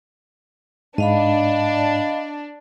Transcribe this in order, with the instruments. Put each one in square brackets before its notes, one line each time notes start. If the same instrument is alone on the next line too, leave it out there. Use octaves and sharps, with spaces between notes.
[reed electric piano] G#2 [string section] D4 [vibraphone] D#5 F5 B5